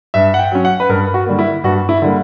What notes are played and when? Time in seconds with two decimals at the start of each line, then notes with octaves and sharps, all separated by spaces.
0.14 G2 E5
0.34 F#5
0.39 G5
0.52 F#3 C#4
0.65 F#5
0.80 B4
0.89 G2 A#4
1.14 F#4
1.26 D3 G3 A#3
1.39 E4
1.64 G2 F#4
1.89 E4
2.02 D3 G3 A#3